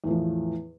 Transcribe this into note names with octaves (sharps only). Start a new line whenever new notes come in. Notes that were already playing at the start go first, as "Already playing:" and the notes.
E2 A2 F3